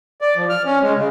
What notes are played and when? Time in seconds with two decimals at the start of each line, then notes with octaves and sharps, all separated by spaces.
0.21 D5
0.36 F3
0.50 F6
0.66 C#4
0.82 G#3
0.95 C#3